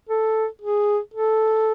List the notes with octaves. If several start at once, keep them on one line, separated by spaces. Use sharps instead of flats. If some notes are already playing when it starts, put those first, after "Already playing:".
A4
G#4
A4